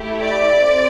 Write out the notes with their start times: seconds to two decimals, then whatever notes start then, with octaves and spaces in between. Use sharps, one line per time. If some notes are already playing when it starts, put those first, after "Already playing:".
Already playing: A3 E4 G4
0.21 D5
0.59 C4